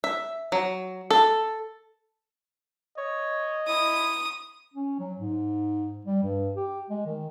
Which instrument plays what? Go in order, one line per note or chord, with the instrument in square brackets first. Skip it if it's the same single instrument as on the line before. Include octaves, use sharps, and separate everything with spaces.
[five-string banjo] E5
F#3
A4
[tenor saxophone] C#5 [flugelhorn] D#5
[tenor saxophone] E4 [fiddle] D#6
[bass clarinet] C#4
F#3
G#2
G3
G2
G4
G#3
D#3